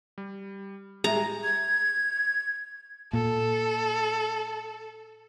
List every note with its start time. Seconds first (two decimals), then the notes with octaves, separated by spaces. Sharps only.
0.18 G3
1.04 A2 G3 G#3 G#4 E5 A#5 F7
1.44 G#6
3.13 A#2 A4